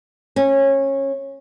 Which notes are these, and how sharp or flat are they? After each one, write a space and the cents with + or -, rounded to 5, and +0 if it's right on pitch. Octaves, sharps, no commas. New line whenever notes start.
C#4 -20